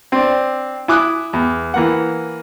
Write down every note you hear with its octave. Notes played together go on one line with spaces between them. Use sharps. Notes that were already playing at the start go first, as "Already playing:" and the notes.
C4 D4
E4 G#5 D6 D#6 F#6
E2
E3 A#3 F#5